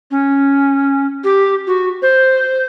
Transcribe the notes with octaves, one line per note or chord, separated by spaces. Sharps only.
C#4
G4
F#4
C5